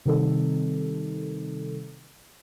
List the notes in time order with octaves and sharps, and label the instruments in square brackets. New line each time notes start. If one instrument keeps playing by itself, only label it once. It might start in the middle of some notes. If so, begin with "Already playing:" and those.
[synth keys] C3 D#3 G3 C4 D#4 A4